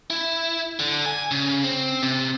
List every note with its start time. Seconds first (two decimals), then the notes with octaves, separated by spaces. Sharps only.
0.10 E4
0.80 D3
1.06 G#5
1.31 C#3
1.64 C4
2.03 C3